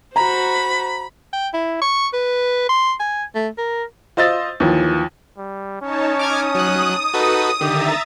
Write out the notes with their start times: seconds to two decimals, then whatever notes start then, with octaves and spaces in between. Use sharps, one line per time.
0.16 F#4 C5 A#5 B5
1.33 G5
1.54 E4
1.82 C#6
2.14 B4
2.69 C6
3.00 G#5
3.35 A3
3.58 A#4
4.17 F4 C5 D#5 E6 A6
4.60 D#2 E3 F3
5.37 G3
5.81 C#4 D#4 C#5 A5
6.19 D6 D#6 F6 G#6
6.55 F#3 F#6
7.14 D#4 F#4 A4 B4
7.61 D3 D#3 G4 E5 A#5 A6